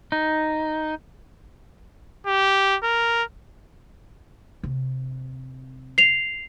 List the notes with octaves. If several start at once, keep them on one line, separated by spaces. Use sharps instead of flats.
D#4
G4
A#4
C3
C7 F7